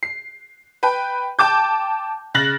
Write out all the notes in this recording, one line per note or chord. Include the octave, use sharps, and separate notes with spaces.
C7
B4 G5
G5 A5 D6 G6
C#3 F#6 A6 A#6 F#7